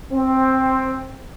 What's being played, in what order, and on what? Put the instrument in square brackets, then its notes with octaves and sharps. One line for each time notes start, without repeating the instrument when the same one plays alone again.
[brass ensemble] C4